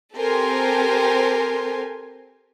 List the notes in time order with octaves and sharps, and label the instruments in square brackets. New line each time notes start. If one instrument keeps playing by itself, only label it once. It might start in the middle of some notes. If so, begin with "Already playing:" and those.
[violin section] C4 G4 A4 A#4 G#5 C6